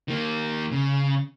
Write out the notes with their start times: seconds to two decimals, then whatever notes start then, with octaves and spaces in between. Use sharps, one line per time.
0.08 D#3 A#3
0.72 C#3